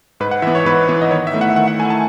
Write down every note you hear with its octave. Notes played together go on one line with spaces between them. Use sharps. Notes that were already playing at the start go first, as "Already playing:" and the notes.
G#2 B4
F#5
E3 B3 E5
C#5
G#2 B4
E3 B3
D#5
D#3 C#5
E5
A3 E4
F#5
E5
D#3 F#5
F#5
A3 E4 G#5
A5